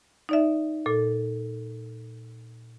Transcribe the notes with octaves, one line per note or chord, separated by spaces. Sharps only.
D#4 D5 E5
A#2 A4